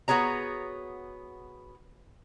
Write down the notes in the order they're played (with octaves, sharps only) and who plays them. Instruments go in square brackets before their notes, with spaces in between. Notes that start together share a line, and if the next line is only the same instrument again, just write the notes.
[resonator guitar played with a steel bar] B3 F#4 G#4 C#5 A#5